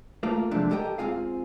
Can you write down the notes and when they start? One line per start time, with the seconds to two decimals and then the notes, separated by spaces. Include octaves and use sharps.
0.23 A3 A#3 F4
0.51 C3 F3 G#3 A3 C4 D4
0.71 G4 A4 A#4 D#5 G5
0.98 G#2 C4 F4 G#4 F5